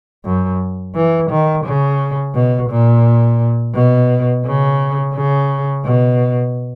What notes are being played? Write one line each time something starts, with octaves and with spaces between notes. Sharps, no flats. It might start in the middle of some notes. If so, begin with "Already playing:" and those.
F#2
E3
D#3
C#3
B2
A#2
B2
C#3
C#3
B2